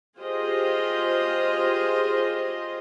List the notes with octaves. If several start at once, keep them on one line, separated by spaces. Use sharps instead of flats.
F4 G4 G#4 C5 D#5